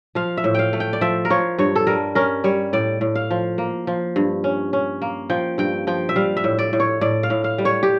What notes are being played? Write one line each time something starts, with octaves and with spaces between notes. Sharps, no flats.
F3 F5
E5
A2
F5 G5
A3
G5
D5
F3 E5
A#4
F3 C#5
G2 C#5
A4
G3 A#4
C#4 A#4
G3 C#5
A2 D5
A2
F5
F3
A#3
F3
G2
C#4
C#4
A#3
F3 G5
G2 G5
F3 G5
E5
G3 F5
E5
A2
D5
A2
C#5
A2 D5
F5
A2
F5
G3
C#5
G4